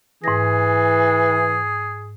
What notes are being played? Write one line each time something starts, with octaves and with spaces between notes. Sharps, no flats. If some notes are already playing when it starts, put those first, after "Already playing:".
G#2 E3 G#4 A#6